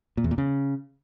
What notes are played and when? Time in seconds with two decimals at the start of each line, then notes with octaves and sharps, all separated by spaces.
0.17 A#2
0.24 E2
0.31 A#2
0.38 C#3